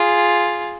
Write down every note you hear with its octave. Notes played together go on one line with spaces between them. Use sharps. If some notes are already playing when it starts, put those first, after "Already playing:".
Already playing: F4 G#4